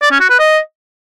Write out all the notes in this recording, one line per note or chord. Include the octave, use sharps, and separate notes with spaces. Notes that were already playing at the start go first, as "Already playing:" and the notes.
D5
C#4
F#4
B4
D#5